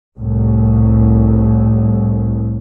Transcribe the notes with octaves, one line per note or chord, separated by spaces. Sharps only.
C2 A2